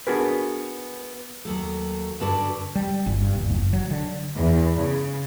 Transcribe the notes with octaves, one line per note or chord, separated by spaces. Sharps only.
B3 D4 F#4 G#4 A#4 B4
D#2 F#3 A3
G2 D3 D4 F#4 B4 D5
G3
G1
G2
D#1
F#1
F#3
D3
E2
C#3